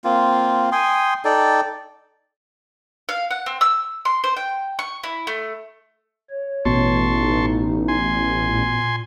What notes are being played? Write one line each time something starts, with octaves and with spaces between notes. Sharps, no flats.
A#3 C4 F4
G5 G#5 C6 D#6
D#4 A4 D5 G5
F5
F#5
C4
E6
C6
C5
G5
C#6
E4
A3
C#5
A1 B2 A5 C6 C#6
D#4
G#5 C6
A#2